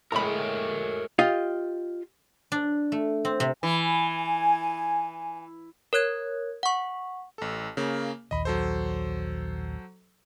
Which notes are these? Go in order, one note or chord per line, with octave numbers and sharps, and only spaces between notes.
A2 G#3 A#4 C#5 G5 A#5 B5
F4 G4 D#5 F5
D4
A3
C4
C3
E3 G#5
A#4 C#5 F#6 G#6
F#5 C#6
A1 A4
C#3 A#3
A#1 D#2 D#5 B5
F#3 A4 C5